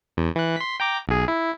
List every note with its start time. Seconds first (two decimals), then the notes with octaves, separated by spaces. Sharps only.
0.17 E2
0.36 E3 F#6
0.56 C6 B6
0.80 G5 A#5 D6
1.08 B1 G#4
1.28 E4